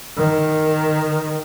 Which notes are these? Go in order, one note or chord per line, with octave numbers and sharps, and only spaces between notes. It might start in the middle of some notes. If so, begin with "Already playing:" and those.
D#3